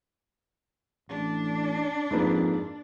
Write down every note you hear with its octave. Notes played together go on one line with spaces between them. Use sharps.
A1 D4
F2 G#2 A#3 B4